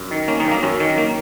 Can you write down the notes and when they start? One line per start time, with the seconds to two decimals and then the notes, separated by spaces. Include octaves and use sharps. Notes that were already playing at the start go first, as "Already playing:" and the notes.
Already playing: F#2
0.11 D#3
0.28 A#3 C#4
0.40 D#3 D#4
0.46 F#2
0.51 A#3
0.63 F#2 C#4
0.80 D#3
0.98 A#3